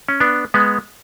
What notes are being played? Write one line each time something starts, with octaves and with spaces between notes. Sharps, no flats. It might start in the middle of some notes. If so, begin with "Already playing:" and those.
C#4
B3 D4
G#3 B3